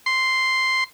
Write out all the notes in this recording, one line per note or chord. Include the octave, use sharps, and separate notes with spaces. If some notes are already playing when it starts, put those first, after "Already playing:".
C6